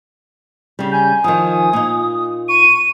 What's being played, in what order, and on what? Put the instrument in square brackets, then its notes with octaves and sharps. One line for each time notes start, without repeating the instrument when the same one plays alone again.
[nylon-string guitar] C#3 G3
[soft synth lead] G#5 [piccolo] G6
[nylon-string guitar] D#3 F3 [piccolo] D#6
[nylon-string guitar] A#2 D#4
[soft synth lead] C#6 [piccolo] D#7